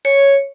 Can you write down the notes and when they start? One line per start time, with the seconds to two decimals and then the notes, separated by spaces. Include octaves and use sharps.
0.05 C#5